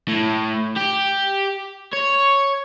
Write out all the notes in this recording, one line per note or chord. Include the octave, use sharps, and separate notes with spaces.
A2
G4
C#5